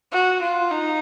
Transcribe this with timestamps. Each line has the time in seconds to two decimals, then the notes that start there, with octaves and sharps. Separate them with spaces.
0.12 F#4
0.41 F4
0.71 D#4